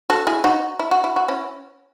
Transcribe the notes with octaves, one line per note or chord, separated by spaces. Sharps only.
F#4 A4
E4 G#4
D#4 F#4
E4
F#4
E4
F#4
C#4 E4